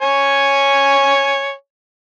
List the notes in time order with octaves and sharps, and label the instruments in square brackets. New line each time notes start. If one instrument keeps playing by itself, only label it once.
[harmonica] C#5 G#5